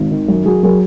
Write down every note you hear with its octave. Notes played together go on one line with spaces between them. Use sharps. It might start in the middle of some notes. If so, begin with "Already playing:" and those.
Already playing: G#1
D#3
F#2
F#2 F#4 G#4
F#3 G#4 A#4